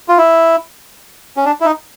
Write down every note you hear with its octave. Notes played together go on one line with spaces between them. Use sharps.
F4
E4
C#4
D4
E4
D#4